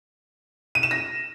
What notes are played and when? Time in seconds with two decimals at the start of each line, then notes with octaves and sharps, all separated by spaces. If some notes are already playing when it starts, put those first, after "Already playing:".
0.75 D#7
0.83 E7
0.91 A#6